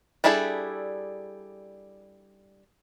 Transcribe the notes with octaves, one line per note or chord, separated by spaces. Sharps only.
G3 D4 E4 G#4 A4